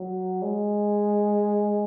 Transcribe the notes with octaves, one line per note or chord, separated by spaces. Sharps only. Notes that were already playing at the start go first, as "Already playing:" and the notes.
Already playing: F#3
G#3